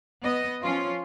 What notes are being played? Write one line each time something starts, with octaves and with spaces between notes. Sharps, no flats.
B3 D#5
F3 C#4 F4